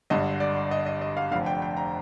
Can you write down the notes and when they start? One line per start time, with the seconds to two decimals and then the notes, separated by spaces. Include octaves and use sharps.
0.10 G#1 G2 D3 D#5
0.40 D5
0.71 D#5
0.86 D#5
1.01 D#5
1.17 F5
1.31 F1 F2 D3 F5
1.46 G5
1.62 G5
1.77 A#5